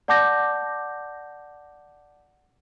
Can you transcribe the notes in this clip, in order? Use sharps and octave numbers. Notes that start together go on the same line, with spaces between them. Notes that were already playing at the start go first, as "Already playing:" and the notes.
D5 F#5 A5 D6 G6 A#6